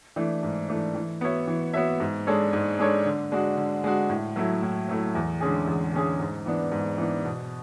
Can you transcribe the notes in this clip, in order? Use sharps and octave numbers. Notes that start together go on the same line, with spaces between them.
E3 A3 D4
G#2
E3 A3 D4
E3
B3 F#4 C#5 E5
E3
B3 F#4 C#5 E5
G#2
G#3 D4 A4 C#5
G#2
G#3 D4 A4 C#5
D3
G#3 D4 F#4
D3
G#3 D4 F#4
A2
F#3 A3 E4
A2
F#3 A3 E4
E2
D3 G#3 C#4 G#4
E2
D3 G#3 C#4 G#4
G#2
E3 B3 D4
G#2
E3 B3 D4
B2